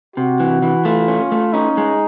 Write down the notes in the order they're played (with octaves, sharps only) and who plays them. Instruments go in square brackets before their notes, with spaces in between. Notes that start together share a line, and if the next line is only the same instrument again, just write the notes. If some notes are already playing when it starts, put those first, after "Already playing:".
[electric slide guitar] C3 [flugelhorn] F#4
[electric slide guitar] E3
E3
[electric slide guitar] A3 [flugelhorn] F4
[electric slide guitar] C#4
A3
[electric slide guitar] C#4 [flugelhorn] D#4
[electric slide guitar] G#3